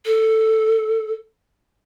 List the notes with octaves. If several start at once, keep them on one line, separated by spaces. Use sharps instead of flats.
A4